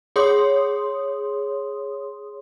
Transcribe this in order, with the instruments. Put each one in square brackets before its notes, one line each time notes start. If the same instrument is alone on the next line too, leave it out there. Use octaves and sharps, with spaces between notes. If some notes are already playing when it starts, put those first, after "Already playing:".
[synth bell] G#4 C#5 C6 D#6